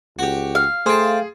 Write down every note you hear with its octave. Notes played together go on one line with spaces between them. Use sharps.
C#2 F#4 G4
F5
A3 G#4 C5 G5 A5 C6